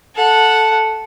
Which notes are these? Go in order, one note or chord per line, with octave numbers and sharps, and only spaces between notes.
A4 F#5